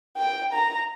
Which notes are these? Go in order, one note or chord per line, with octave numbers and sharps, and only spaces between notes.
G5
A#5